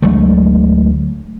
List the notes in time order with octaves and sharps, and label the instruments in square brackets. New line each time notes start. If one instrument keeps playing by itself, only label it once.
[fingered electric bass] D2 F#3 G#3 A3